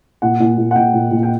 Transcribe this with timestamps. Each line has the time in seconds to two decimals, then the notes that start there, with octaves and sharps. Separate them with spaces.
0.22 A#2 F#5
0.40 A#2
0.58 A#2
0.71 F#5
0.76 A#2 G5
0.94 A#2
1.11 A#2
1.23 G5